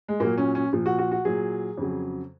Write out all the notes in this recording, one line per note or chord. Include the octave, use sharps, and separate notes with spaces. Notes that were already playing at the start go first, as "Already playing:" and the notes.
G#3
A#2 F#3 A#3
C#4
C#4
A#2 F3
F#4
F#4
F#4
A#2 F#3 G#4
F2 C#3 F#3